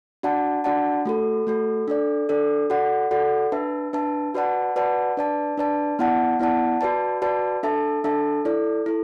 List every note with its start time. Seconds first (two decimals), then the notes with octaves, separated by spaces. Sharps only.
0.23 D4 F#4 D5 F#5 A5
0.64 D4 F#4 D5 F#5 A5
1.05 A3 F#4 A4
1.47 A3 F#4 A4
1.88 D4 A4 D5
2.29 D4 A4 D5
2.70 F#4 A4 D5 F#5
3.11 F#4 A4 D5 F#5
3.52 D4 B4 E5 A5
3.93 D4 B4 E5 A5
4.34 F#4 B4 D5 F#5 A5
4.76 F#4 B4 D5 F#5 A5
5.17 D4 B4 D5 A5
5.58 D4 B4 D5 A5
5.99 B3 E4 D5 F#5 A5
6.40 B3 E4 D5 F#5 A5
6.81 F#4 B4 D5 A5
7.22 F#4 B4 D5 A5
7.63 D4 A4 E5 A5
8.04 D4 A4 E5 A5
8.45 E4 A4 D5
8.86 E4 A4